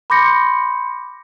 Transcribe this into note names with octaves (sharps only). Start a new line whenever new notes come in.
B5 C6 D6 G6 A#6 C#7